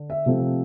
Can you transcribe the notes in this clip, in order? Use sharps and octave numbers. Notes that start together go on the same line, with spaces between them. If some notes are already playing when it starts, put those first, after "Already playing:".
Already playing: D3
E5
C3 F3 A3 C4